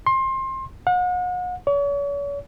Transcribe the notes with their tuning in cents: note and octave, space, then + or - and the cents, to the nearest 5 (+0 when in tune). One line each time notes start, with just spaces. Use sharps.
C6 +25
F#5 -40
C#5 +40